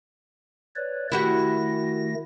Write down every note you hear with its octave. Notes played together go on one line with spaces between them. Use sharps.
B4 C#5 D5
D#3 A3 E4 F#4 G4 A#6